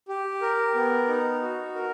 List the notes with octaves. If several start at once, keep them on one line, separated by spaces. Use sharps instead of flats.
G4
A#4
B3
D#4
F#4
A#4